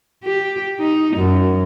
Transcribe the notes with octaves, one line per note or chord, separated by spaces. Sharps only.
G4
D#4
F#2